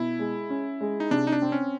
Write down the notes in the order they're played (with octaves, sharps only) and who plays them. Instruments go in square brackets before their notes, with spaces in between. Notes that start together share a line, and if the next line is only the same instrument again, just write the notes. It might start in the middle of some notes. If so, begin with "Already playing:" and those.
Already playing: [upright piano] B2 [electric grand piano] E4
[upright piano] G#3
C#4
G#3
[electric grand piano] D#4
[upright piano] C3 [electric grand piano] D4
[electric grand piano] D#4
D4
[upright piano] C4
[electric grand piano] C#4